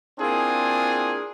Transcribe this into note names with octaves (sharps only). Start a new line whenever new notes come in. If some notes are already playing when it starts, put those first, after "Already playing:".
A#3 C4 D4 E4 F4 G#4